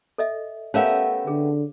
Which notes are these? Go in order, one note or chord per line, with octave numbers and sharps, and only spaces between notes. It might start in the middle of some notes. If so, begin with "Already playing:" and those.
A4 D#5 E5
A3 B3 C#4 G4 A#4 C#5 E5 F5
D3 G#4